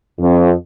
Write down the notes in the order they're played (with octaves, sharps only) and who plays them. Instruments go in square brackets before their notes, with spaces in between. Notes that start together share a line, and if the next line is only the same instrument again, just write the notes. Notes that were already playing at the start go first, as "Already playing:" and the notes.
[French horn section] F2